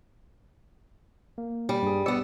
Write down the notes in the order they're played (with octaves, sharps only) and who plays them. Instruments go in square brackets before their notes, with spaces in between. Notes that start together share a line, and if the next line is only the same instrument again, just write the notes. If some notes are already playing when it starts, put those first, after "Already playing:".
[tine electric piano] A#3
[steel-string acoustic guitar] G3
[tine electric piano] G2 G#4
[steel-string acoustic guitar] B3 D5 [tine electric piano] E6 C#7